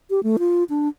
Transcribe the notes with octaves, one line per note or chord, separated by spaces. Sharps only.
G4
A3
F4
D4